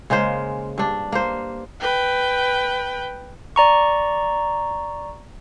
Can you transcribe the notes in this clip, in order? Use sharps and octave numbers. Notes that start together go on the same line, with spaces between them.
C#3 G#3 A#3 C5
G2 D4
A#3 C5
B4 G5
D5 A#5 C#6